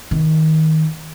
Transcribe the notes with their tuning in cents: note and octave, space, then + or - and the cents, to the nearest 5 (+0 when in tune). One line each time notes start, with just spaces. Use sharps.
D#3 +20